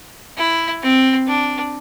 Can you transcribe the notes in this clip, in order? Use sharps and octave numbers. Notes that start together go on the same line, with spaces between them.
E4
C4
D4